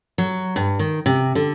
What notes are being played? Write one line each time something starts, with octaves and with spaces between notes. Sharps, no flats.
F#3
G2
D#3
C3
D3